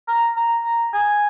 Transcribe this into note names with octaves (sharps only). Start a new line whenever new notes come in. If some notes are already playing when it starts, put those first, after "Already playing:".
A#5
A#5
A#5
G#5